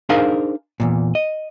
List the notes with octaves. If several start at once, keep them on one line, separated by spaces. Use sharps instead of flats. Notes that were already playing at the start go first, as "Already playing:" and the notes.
D4 D#4 G#4 A#4 C5 F5
E2 G2 A#2
D#5